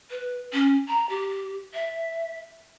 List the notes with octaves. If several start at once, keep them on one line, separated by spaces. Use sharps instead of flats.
B4
C#4
A#5
G4
E5